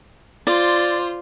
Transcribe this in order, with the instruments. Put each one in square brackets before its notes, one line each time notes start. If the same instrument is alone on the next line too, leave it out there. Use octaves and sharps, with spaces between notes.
[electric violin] F4 C5 [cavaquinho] D5